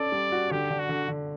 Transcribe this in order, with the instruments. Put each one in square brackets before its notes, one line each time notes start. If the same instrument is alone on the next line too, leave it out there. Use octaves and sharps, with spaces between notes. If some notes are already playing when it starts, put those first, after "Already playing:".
Already playing: [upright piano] C#4 A4 [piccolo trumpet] D5
[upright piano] G3
F#4
[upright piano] D3 [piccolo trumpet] G4
[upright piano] D3
[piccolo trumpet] F#4
[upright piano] D3
D3